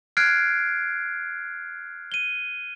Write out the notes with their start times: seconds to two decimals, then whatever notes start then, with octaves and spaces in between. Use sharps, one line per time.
0.17 F6 F#6 G#6 C7 D7
2.12 D#7 G7